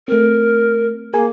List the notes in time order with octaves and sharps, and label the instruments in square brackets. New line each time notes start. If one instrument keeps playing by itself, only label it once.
[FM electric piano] A3 C4 [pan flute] A#4
[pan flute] A#3 [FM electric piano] G#4 A#4 G#5